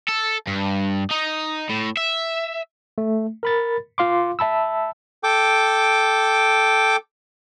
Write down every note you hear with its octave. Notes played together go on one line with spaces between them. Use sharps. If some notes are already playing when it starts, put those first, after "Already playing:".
A4
G2
D#4
A2
E5
A3
A#4 B5 A6
F4 F5 C6 D6
E5 A5 B5 E6
A4 G5 D6